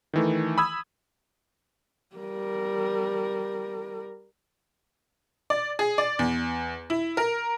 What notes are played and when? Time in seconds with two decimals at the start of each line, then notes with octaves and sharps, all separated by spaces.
0.13 D#3 E3 A3
0.58 B5 D#6 E6 G#6
2.16 G3 A#4
5.50 D5
5.79 G#4
5.98 D5
6.19 E2
6.90 E4
7.17 A#4